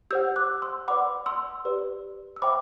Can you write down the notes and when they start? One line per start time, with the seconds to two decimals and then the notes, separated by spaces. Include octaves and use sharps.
0.11 G4 C5 F#5 E6 G6
0.36 D6 F#6
0.62 C6 E6
0.88 B4 D5 F#5 B5 D6
1.26 C6 E6
1.65 G4 B4 D5
2.36 E6
2.42 C5 E5 G5 B5 D6